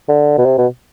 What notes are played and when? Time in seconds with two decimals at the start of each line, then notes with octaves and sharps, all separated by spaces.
0.09 D3
0.38 B2
0.45 C3
0.58 B2